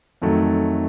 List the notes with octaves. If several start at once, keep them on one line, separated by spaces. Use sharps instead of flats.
F2 D#3 F#3 A3